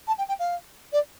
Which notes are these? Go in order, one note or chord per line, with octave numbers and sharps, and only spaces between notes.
A5
G5
G5
F5
D5